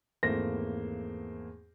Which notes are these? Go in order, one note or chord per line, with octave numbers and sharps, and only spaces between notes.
G#1 E2 A3 A#3 C5 A#6